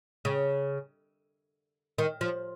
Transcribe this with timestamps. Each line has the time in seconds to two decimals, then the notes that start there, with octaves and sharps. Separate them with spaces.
0.25 C#3
1.98 D#3
2.21 F3